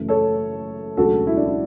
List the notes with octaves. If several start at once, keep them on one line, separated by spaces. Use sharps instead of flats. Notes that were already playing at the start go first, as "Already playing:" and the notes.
Already playing: F#1 F#2 E3 A3
A4 C#5
E1 D2 C#3 F#3 F#4 A4
E4
D4
E4